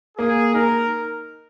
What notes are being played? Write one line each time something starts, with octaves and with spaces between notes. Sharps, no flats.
A#3 G#4
D#4 A#4